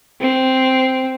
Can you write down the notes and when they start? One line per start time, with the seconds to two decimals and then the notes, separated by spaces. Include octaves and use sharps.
0.21 C4